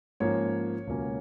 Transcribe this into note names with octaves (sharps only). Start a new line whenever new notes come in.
G#2 F3 A#3 C#4 C#5
C#2 B2 F#3 A#3 C#4